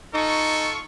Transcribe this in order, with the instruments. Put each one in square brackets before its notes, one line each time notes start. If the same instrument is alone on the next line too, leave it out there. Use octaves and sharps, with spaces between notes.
[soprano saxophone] D#4 [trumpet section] F4 A4 C#6